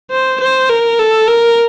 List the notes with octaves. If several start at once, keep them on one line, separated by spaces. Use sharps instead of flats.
C5
C5
A#4
A4
A#4